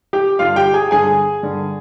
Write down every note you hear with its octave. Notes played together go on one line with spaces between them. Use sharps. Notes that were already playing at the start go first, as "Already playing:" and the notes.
G4 G5
G2 D3 F4 F5
G4 G5
G#4 G#5
G2 D3 G#4 G#5
G2 D3